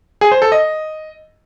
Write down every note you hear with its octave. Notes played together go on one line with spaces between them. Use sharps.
G#4
C5
A4
D#5